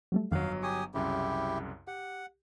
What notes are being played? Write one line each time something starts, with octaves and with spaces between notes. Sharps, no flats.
F#3 G3 A3
G1 F2 D#3 F#3 F5 F#5
G4 G#5 C#6 D#6
C2 F#2 C#3 E4 G4
G4 F#5